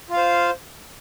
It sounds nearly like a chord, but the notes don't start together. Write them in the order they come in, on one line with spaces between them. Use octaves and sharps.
F4 F5 C5